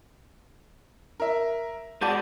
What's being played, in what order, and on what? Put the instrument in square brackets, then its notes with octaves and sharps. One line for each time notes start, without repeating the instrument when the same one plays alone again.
[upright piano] A#4 E5
[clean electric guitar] G#3 F#4 D5 [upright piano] A5 G6 D#7